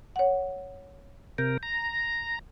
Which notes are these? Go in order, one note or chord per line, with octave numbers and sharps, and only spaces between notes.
C#5 F#5
C3 A#4 G6
A#5